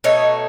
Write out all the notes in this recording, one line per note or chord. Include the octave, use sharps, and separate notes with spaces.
B2 A3 D#4 C#5